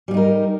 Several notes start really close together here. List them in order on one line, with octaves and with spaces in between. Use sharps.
G3 F4 D#4 A#4